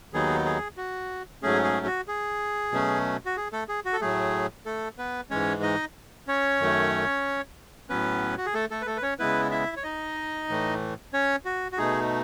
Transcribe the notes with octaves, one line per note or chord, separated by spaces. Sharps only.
D#2 D#3 F#3 B3 D#4 G#4
G#4
F#4
G#2 F#3 A3 C#4 G#4
G#4
F#4
G#4
B2 F#3 A3 C#4
F#4
G#4
A3 A4
G#4
F#4
A4
A2 F#3 A3 G#4
A3 A4
B3 B4
G#2 E3 G#3 C#4 C#5
D#4 D#5
C#4 C#5
F#2 D#3 A3
A2 F#3 B3 C#4 B4
F#4
G#4
A3 A4
A3 A4
B4
A3 A4
B4
C#4 C#5
C#3 G#3 B3 E4 B4
E4 E5
C#5
D#4 D#5
A2 E3 A3
C#4 C#5
F#4
F#4
B2 A3 D#4 G#4